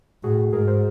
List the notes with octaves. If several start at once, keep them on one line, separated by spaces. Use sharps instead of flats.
A2 F#4 G#4
G#2 G#4 A#4
A#4 C5